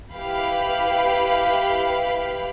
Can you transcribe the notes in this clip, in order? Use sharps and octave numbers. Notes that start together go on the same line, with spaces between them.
E4 G4 B4 F5 B5